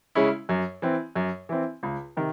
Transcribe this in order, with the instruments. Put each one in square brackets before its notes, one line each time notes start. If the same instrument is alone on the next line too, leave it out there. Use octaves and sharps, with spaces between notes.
[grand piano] C#3 G#3 C#4 E4
F#2
E3 C4
F#2
E3 C4
C#2
C3 D#3